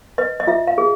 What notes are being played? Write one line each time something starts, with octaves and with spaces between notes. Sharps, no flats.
B4 D#5
D#5
F4 E5
F5
G#4